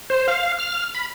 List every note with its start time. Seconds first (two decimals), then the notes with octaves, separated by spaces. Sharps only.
0.10 C5
0.28 F5
0.59 F6
0.95 B5